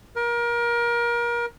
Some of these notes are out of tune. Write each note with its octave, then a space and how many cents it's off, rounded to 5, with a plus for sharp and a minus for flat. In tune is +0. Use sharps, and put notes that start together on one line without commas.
A#4 +30